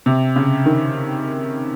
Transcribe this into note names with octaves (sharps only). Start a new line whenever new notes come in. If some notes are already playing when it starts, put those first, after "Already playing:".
C3
C#3
D#3